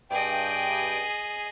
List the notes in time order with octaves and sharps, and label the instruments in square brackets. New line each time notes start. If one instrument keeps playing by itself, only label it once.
[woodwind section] G2 G5 [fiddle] G#4 D#5